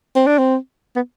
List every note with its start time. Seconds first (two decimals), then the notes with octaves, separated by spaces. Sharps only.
0.16 C4
0.27 D4
0.39 C4
0.96 B3